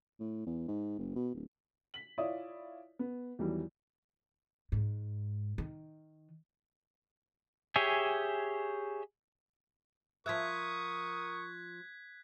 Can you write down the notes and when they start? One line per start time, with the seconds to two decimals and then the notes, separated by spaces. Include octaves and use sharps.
0.20 A2
0.47 E2
0.68 G#2
0.99 F#1
1.15 B2
1.35 D1
1.94 B6 F#7
2.18 E4 F4 C#5 D5 E5 D#6
2.99 B3
3.39 E2 D#3 E3 F#3 G3
4.72 G#2
5.58 D#3
7.76 G4 G#4 C#5 E5 G#5
10.26 F3 A#4 E5 C#6 D#6 F#6 G#6 B6